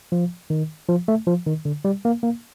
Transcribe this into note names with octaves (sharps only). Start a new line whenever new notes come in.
F3
D#3
F3
A3
F3
D#3
D3
G3
A#3
A#3